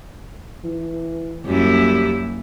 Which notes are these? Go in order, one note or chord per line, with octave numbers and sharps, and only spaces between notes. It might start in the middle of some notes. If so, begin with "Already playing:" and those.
E3
F#2 G3 A#3 E4